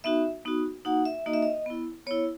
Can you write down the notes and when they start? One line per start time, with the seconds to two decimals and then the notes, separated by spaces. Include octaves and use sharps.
0.04 B3 D#4 F#4 E5
0.45 B3 D#4 F#4
0.85 A#3 D#4 F#4 F#5
1.05 E5
1.26 A#3 D#4 F#4 D#5
1.33 E5
1.42 D#5
1.66 B3 E4
2.07 B3 E4 C#5